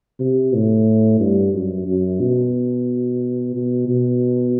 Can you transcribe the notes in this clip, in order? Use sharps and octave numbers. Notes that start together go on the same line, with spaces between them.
C3
A2
G2
F#2
F#2
B2
B2
B2